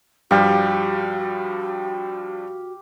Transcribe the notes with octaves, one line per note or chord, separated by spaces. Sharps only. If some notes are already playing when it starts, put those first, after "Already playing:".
G2 F3 G3 F#4 G4 F5